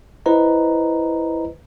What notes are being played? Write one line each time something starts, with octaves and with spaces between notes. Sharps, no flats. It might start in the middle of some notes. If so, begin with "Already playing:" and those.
E4 B4 C5 D#5 A#5